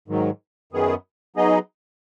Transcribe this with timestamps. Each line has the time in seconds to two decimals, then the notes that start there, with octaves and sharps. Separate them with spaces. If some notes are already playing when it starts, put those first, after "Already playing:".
0.08 G#2 D#3 F#3
0.73 F#2 D#3 B3 G#4
1.36 F#3 B3 D#4 G#4 D#5